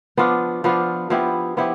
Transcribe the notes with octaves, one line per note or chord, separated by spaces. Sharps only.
F3 B3 D4 F4
F3 B3 D4 F4
F3 B3 E4 G4
F3 B3 E4 G4